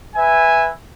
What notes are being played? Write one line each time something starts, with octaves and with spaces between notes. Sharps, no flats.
B4 E5 G#5